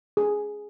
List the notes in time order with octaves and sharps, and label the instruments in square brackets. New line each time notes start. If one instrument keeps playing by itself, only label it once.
[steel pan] G#4